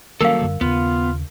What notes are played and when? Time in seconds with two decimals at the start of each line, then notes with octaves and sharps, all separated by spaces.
0.21 D#3 F#3 G3 A#3 C#4 A4 A#4 F5
0.39 F#2 D3 G3
0.61 D#2 C#3 B3 F4